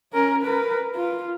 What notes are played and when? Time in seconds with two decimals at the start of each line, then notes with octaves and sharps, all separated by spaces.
0.13 C#4 A#4
0.43 A#4 B4
0.95 F4